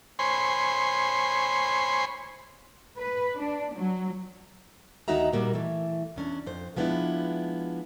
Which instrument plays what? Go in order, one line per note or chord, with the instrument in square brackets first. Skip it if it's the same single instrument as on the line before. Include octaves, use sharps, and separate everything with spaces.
[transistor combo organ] C5 C#5 G#5 B5 C6
[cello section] B4
D4
F#3
[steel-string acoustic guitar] D2 D#3 D#4 F#4 E5 A#5
A#2 G3 A#3 F#4
E3 A3
E2 C#4 D4
F2 C5
F3 G#3 B3 C#4 D4 E4